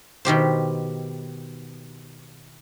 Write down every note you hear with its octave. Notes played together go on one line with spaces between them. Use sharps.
B2 D#3 G4 C5